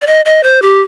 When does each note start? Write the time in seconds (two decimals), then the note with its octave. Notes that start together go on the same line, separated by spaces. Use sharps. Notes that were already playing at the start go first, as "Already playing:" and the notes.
0.02 D5
0.07 D#5
0.25 D#5
0.43 C5
0.62 G4